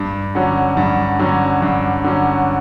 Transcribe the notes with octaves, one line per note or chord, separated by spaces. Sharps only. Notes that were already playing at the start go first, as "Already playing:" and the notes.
Already playing: G2
D3 F#3 C#4
G2
D3 F#3 C#4
G2
D3 F#3 C#4